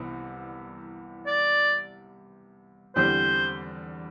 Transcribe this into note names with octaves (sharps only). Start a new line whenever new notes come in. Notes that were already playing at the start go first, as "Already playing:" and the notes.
Already playing: C2 C3 E3 G3 B3
D5
E2 D3 G3 C4 C5